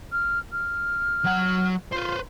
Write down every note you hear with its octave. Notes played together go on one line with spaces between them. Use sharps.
F6
F6
F#3 F#5
F4 B4 C5